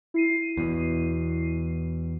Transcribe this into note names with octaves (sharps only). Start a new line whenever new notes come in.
E4 C7 D#7
E2 B2